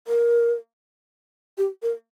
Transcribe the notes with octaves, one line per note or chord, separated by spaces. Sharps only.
A#4
G4
A#4